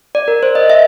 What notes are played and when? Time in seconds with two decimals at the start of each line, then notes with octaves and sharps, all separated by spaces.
0.15 D5
0.28 A#4
0.43 C5
0.55 D#5
0.70 E5